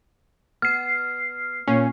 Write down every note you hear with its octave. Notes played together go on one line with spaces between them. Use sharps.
B3 F6 C7
A#2 C#4